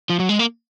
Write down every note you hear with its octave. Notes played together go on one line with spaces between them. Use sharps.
F3
F#3
G#3
A#3